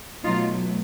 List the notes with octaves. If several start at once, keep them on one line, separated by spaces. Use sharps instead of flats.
B2 F#3 A3 D#4 F4